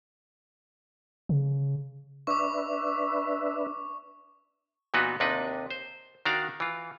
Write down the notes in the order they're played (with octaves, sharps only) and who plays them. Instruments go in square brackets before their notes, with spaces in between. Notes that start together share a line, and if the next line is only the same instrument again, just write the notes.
[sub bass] C#3
[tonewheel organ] D4 B4 E5 [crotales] C#6 D6
[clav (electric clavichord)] A#2 E3 B3 D#4 F#4 B4
D#2 C3 D4 D#4 B4
C5
D#3 D4 F#4 D5 F5 A#5
E3 F4